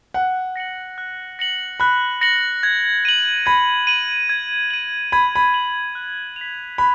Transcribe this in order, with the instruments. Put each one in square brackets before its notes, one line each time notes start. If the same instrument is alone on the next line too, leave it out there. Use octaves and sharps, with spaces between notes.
[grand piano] F#5 [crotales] F#6
[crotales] A#6 C#7 F#7
F#6
A#6 C#7 F#7
[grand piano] B5 [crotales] F#6
[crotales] A#6 C#7 F#7
G#6
D#7 F#7
[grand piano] B5 [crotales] G#6
[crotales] D#7 F#7
G#6
D#7 F#7
[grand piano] B5 [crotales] G#6
[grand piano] B5
[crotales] D#7 F#7
F#6
F7
B6
[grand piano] B5 [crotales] F#6